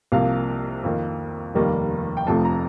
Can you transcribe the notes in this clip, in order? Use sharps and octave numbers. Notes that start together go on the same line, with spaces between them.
C2 C3 F3 A#3 F5
F2 D#3 A#3
F1 D#2 D#3 G3 A#3
G5
F1 F2 C3 F3 A3 A5
A#5